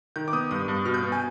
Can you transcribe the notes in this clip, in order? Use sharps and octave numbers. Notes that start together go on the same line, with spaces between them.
D#3 G6
D6
B3 D#6
G2 D#6
G2
B2 F6
G6
B3
G#5